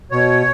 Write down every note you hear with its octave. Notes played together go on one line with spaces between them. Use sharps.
B2 C#5